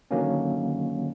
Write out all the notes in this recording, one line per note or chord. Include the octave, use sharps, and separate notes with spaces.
D3 D#3 F#3 A#3 C#4